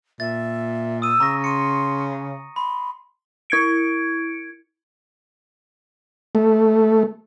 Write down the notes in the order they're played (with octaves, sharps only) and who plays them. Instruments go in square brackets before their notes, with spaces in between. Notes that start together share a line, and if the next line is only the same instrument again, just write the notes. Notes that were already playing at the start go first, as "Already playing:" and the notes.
[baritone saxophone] A#2 [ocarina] E5 [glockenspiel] A6
[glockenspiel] D#6 D#7 [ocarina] E6
[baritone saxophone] C#3 [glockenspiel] A#5 C#6 A#6
[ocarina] C6 [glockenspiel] C#7 D#7
[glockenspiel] B5 [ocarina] C6
[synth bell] E4 G#6 C#7 D7
[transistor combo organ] A3